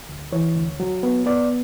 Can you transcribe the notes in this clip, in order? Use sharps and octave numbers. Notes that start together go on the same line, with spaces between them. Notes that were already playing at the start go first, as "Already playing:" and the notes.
D2
E3 C#5
D2
F#3
B3
B3 D5